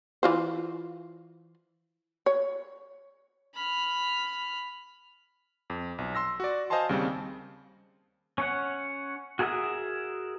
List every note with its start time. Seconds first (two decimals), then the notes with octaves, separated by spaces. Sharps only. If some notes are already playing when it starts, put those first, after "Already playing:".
0.23 E3 F4 C5
2.26 C#5
3.55 B5 F6
5.70 F2
5.98 B1
6.15 C6 E6 A#6
6.40 F#4 D5
6.70 C5 D#5 F5 G#5 A5 C6
6.89 D#2 C#3 G3 C4
8.38 C#4 C#5 F#5
9.39 F#4 G#4 A#4 E5 D#6